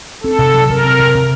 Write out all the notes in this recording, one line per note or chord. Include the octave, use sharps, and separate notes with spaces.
C4 A4
C3
F#3
C3 A#4
C4
C3
C3